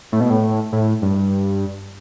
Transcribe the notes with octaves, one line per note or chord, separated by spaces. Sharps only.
A2
B2
A2
A2
G2